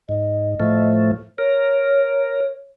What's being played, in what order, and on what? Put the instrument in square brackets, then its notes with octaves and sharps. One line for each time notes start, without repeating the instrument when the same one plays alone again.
[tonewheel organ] G#2 [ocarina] D#5
[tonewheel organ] A2 F3 A3
[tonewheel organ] A#4 [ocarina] C#5